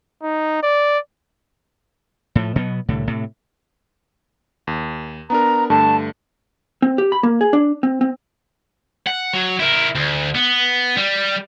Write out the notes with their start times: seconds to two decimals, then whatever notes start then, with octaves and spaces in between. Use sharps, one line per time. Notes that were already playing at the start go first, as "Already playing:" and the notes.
0.23 D#4
0.63 D5
2.35 A2 F3
2.56 B2 F#3 G3 B3
2.89 C2 A2 D3
3.07 A2 C3
4.67 D#2
5.30 B3 D4 A#4 A#5
5.70 G2 D3 A3 A5
6.82 C4
6.98 G4
7.12 B5
7.23 A#3
7.41 G#4
7.53 D4
7.83 C4
8.01 C4
9.07 F#5
9.34 F#3
9.60 E4 A#4
9.95 D2
10.35 B3
10.97 G3